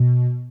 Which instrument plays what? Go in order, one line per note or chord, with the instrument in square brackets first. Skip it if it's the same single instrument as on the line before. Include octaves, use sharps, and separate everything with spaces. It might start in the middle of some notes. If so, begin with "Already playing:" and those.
Already playing: [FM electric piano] B2